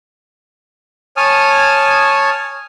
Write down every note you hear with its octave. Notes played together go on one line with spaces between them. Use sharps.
C#5 G#5 A5 D#6 F6